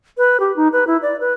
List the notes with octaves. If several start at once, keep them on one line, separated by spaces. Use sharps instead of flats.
B4
G4
D#4
B4
E4
D5
B4